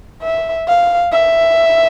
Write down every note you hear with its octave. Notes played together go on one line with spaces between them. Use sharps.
E5
F5
E5